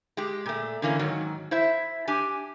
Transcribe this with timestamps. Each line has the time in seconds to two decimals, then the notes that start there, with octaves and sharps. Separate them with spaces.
0.17 G#3 G4
0.46 A#2 A3
0.82 D3 E3 A#3 C4 C#4
0.99 G#2 D#3 F#3
1.51 E4 C5 E5
2.07 D4 G4 G#5